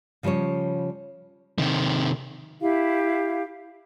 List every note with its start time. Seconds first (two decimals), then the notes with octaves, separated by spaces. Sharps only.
0.23 C#3 F3 G3 C#4 C#5
1.58 C3 D#3
2.61 E4 G4 F5